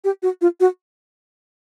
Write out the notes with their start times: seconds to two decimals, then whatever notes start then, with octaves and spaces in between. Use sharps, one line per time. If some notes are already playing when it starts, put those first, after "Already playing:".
0.04 G4
0.23 F#4
0.41 F4
0.60 F#4